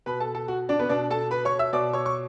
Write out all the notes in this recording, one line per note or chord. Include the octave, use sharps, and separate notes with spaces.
B2 B4 B5
A4 A5
A4 A5
F#4 F#5
D4 D5
B3 B4
B2 D4 D5
A4 A5
B4 B5
C#5 C#6
E5 E6
B2 D5 D6
C#5 C#6
C#6